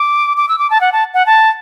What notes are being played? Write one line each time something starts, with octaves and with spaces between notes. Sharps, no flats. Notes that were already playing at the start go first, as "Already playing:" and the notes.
Already playing: D6
D6
E6
D6
A5
F#5
A5
F#5
A5